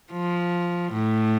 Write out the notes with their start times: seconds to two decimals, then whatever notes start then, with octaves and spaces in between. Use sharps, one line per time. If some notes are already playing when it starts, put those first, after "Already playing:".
0.12 F3
0.93 A2